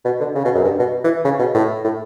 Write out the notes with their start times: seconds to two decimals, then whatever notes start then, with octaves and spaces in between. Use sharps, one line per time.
0.05 B2
0.20 D3
0.35 C#3
0.45 B2
0.55 F#2
0.64 G2
0.79 B2
1.04 E3
1.25 C#3
1.39 B2
1.54 A2
1.84 A2